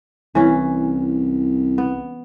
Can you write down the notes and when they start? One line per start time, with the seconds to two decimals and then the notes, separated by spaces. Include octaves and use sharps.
0.35 C2 E3 C#4
1.78 B3